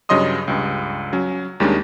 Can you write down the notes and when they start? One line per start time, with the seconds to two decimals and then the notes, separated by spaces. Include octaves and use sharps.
0.09 G2 C#3 F#3 D#5 C6 D#6
0.48 C#2 G2
1.13 F#3 C#4
1.60 D#2 D#3 G3 G#3 C#4 D4